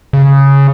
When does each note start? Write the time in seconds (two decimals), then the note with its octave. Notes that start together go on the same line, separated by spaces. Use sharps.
0.13 C#3